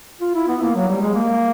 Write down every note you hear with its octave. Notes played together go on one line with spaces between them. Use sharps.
F4
E4
B3
A#3
F#3
G3
G#3
A#3